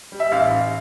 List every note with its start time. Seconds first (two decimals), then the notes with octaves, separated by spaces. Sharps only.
0.12 G3
0.20 E5
0.32 A1 F5
0.51 A1